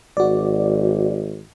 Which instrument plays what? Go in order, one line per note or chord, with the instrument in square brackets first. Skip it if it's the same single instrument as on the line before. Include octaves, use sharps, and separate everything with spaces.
[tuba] G#1 [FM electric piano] F#4 D5